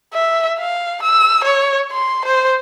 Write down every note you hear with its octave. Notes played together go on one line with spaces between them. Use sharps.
E5
F5
E6
C#5
C6
C5